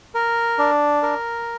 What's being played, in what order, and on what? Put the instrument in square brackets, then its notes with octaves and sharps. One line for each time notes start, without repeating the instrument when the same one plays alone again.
[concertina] A#4
D4
A#4